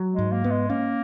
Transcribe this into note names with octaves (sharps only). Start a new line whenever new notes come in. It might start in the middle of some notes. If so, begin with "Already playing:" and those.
Already playing: F#3
G#3
G#2
A#3
B3
G#3
A#3 C#4